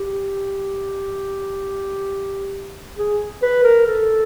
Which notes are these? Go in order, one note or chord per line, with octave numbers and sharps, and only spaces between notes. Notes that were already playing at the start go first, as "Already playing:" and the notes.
Already playing: G4
G#4
B4
A#4
A4